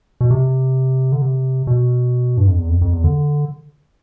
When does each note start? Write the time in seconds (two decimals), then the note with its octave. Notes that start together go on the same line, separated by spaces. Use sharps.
0.21 B2
0.31 C3
1.12 D3
1.22 C3
1.67 B2
2.37 G2
2.47 F2
2.58 E2
2.69 F2
2.81 F2
2.93 E2
3.04 D3